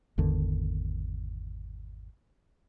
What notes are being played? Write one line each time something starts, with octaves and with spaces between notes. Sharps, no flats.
G#1 E2 D3 D#3